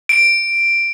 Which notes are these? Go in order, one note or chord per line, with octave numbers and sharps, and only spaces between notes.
D7